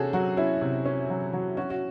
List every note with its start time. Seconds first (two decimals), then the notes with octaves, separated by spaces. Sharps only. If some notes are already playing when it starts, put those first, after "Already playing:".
Already playing: C3 C#4 F#4 G#4 A4
0.13 F#3 F#4
0.37 C#4 E4
0.61 C3
0.85 C#4
1.10 F#3
1.33 F#3
1.57 C#4 F#4
1.70 F#4